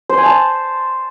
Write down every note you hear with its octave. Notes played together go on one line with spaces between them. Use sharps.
C5
G#5
A5